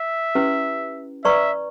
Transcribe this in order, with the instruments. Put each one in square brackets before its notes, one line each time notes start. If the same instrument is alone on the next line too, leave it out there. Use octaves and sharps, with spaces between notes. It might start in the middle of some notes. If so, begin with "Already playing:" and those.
Already playing: [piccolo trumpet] E5
[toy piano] C#4 E4 G4 B4
[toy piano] B4 D5 A#5 C#6 [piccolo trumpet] E5